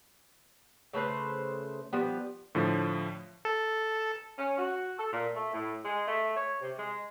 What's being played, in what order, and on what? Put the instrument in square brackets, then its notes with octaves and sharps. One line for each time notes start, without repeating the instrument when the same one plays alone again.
[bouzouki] C#3 A3 B4 C5
F3 G3 B3
[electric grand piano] A2 D3 F3
[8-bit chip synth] A4
[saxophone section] C#4
F#4
A4
A#2
A3
A2
G#3
A3
C#5
C3
G#3